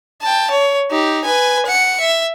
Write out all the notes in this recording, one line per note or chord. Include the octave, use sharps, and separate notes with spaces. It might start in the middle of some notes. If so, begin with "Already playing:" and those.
G5 A5
C#5
D#4 G4
B4 G#5
F#5 C#7
E5